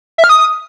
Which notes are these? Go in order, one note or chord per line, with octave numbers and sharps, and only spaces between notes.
E5
F6
D#6